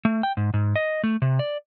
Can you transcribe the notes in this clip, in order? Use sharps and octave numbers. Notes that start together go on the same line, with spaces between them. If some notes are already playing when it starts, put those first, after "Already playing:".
A3
G5
G#2
G#2
D#5
A3
C3
D5